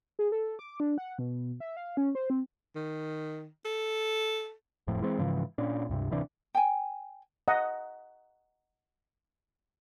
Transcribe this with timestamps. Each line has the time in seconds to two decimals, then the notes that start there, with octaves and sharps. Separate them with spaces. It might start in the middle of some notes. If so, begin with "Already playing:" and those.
0.19 G#4
0.32 A4
0.59 D6
0.80 D4
0.98 F#5
1.19 B2
1.60 E5
1.77 F5
1.97 C#4
2.15 C5
2.30 C4
2.75 D#3
3.65 A4
4.87 F#1 F2 A2 F3
5.01 E3 G#3 C4
5.19 G#2 C#3 E3 F3
5.58 A#2 C#4 D4
5.89 C#2 G2 C3
6.11 D1 C3 E3 D4
6.55 G5 G#5
7.48 D#5 F#5 A#5